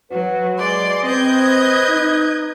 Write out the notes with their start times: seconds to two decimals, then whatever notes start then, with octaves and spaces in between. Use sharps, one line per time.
0.11 F#3 F#4 B4
0.58 G#3 D5 C6
1.04 C4 B4 D#5 G6 G#6
1.88 D#4